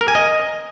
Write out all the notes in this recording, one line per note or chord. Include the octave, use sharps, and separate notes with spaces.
A#4
G#5
D#5